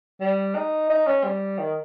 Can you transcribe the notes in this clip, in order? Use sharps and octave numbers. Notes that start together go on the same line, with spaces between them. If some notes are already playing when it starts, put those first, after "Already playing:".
G3
D#4
D#4
C#4
G3
D#3